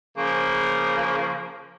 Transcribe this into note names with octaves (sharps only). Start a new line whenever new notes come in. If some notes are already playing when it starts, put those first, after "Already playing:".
C#3 F3 A#3